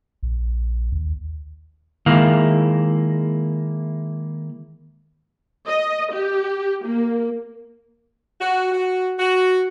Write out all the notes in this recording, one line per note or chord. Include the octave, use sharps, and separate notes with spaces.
A#1
D#2
D#3 G#3 A#3 E4 F5
D#5
G4
A#3
F#4
F#4
F#4